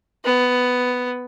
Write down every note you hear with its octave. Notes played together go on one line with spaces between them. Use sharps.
B3